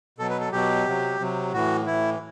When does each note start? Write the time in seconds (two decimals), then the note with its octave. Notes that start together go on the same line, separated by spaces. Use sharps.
0.18 B2 F#3 A4
0.30 B4
0.41 A4
0.52 B2 F#3 G4
0.86 C3 F#3
1.19 C3 F#3
1.52 A2 E3 F#4
1.86 A2 E3 E4